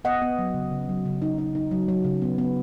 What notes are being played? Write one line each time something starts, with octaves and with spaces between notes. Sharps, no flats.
B3 D#5 F#5
B3
F#3
C#3
C#3
F#3
C#3
D#4
D#4
D#4
F#3
F#3
C#3
B3
B3